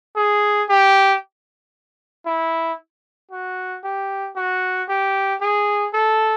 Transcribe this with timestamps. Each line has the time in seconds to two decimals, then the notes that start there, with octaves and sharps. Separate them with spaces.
0.16 G#4
0.69 G4
2.26 E4
3.31 F#4
3.84 G4
4.36 F#4
4.89 G4
5.41 G#4
5.93 A4